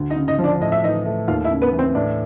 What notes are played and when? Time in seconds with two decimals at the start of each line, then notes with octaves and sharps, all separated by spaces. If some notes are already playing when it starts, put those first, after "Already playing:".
Already playing: D2
0.10 D#4 D#5
0.16 C#3
0.28 D#4 D#5
0.38 F3
0.44 D4 D5
0.61 A2 D#5
0.72 E5
0.83 E3 D#4 D#5
1.06 A3
1.28 D#2 F4 F5
1.44 E4 E5
1.51 C#3
1.62 B3 B4
1.73 E3
1.78 C4 C5
1.95 A2 D4 D5